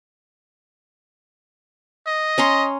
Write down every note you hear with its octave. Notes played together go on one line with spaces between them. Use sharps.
D#5
C#4 A#5 C6